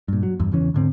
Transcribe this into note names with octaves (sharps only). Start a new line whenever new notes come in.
G2 A#2
F#3
E2 G2
E2 C#3 E3 C#4
G#2 D3 C4